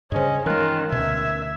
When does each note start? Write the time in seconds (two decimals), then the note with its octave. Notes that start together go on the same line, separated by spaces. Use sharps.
0.12 G2 C#3 C#4 G#4 C5 D#5
0.46 D#3 E3 G#3 C#4 F4 A#4 F#6
0.92 D2 B2 E5 G#6